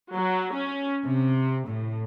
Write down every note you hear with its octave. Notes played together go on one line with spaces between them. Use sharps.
F#3
C#4
C3
A2